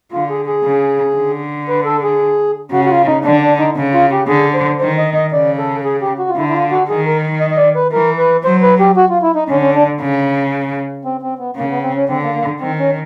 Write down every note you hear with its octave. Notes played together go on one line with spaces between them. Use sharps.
D3 F4
G#4
G#4
C#3
D3
B4
A4
G#4
C#3 F#4
F#4
F4
D#4
D3 D4
D4
D#4
C#3
F4
G4
D3 G#4
C5
D#3 C5
D#5
D#5
C#3 D5
A4
G#4
G4
F#4
F4
D3 E4
E4
F4
F#4
D#3 G#4
A#4
D#5
D#5
D5
B4
E3 A#4
B4
F#3 C5
B4
G4
F#4
F4
E4
D#4
D3 C#4
C#4
D4
C#3
C4
C4
B3
C#3 A#3
B3
C4
C#4
D3 C4
A#3
A#3
D#3 C4
C#4